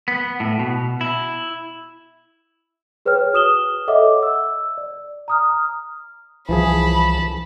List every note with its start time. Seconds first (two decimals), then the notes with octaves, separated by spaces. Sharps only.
0.08 B3
0.40 A2
0.59 B2
1.01 E4
3.06 G#4 B4 C#5 G5 F6
3.33 F#4 D#6 E7 G7
3.88 A4 C#5 D#5 E5 F#5 D6
4.23 E6
4.78 D5
5.28 A#5 D#6 F6
6.49 C2 E3 F3 G#4 A5 B5